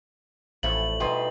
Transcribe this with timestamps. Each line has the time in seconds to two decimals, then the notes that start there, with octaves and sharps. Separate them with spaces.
0.63 A1 F3 A3 E4 F#7
1.00 B2 G3 B3 D#4 C6